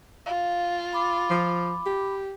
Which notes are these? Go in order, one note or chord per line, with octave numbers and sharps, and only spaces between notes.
F4 F5
B5 D6
F3
G4